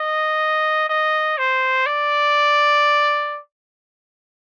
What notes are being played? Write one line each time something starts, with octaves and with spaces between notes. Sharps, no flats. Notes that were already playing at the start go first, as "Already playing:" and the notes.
Already playing: D#5
D#5
C5
D5